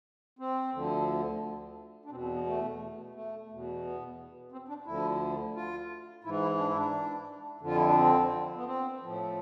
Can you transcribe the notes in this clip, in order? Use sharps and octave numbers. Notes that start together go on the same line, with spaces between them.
C4
D2 D3 F3
D4
E2 B2 C4
C4
B3
A3
A3
E2 B2
B3
C4
D4
D2 D3 F3 E4
F4
G#2 E3 E4
E4
D4
E4
D4
F2 D3 F3 F4
E4
D4
C4
B3
C4
A2 F3